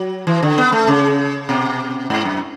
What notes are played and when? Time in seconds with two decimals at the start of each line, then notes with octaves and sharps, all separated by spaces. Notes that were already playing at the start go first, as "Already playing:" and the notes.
Already playing: F#3
0.27 E3
0.42 D3
0.58 B3
0.72 A3
0.87 C#3
1.49 B2
2.10 G#2
2.25 F#2